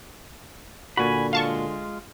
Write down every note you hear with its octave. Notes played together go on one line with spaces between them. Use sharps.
A#2 D3 F#4 G#5 B5
G#3 F4 F5 A5 C#6